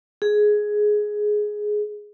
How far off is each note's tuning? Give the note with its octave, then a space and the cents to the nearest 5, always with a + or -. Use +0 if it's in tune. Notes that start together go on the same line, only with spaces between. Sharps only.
G#4 +10